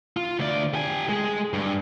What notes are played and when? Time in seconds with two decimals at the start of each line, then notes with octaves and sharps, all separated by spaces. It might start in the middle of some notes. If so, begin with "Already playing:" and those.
0.17 F4
0.39 D2 D5
0.74 G4 G#5
1.09 G#3 G#4
1.53 G2